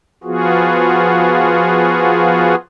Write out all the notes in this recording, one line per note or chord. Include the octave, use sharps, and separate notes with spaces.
F3 B3 F4 F#4 G#4